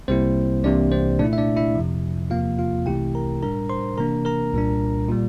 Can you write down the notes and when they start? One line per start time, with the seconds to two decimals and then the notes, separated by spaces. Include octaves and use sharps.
0.08 C2 C3 G3 A#3 C4 E4 C5
0.64 C2 C3 E3 A#3 D4 D5
0.92 C4 C5
1.19 A#2 A3 D4 E4 D5
1.33 E5
1.38 D4 D5
1.56 E4 E5
1.75 F2 C3 F3
2.30 E2 C3 F3 A#3 F4 F5
2.59 F4 F5
2.86 C2 C3 E3 A3 E4 G4 G5
3.15 A#4 A#5
3.43 A2 G3 D4 A#4 A#5
3.69 C5 C6
3.98 C3 E3 A#3 D4 A#4 A#5
4.25 A#4 A#5
4.53 C2 A#2 G3 D4
5.09 A#2 G3